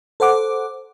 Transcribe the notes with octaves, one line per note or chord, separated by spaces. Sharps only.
A4 C5 F#5 D6